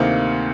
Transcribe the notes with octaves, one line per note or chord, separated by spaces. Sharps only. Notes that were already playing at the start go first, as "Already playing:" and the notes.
Already playing: D2 C3 D#3 A#3 F5